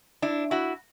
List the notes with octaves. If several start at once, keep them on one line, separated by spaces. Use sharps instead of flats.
D4 E4
E4 F#4